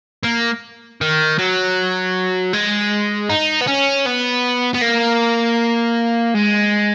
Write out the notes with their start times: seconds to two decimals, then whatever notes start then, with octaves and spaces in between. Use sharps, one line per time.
0.24 A#3
1.01 D#3
1.39 F#3
2.53 G#3
3.30 D#4
3.61 B3
3.68 C#4
4.06 B3
4.75 B3
4.82 A#3
6.35 G#3